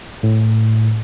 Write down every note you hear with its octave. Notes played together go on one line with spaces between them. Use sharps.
A2